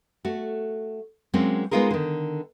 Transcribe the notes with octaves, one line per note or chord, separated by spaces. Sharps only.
A3 F#4
F#3 G#3 A#3 C4 C#4
G#3 B3 D#4 F4 G#4 A#4
D3 D#3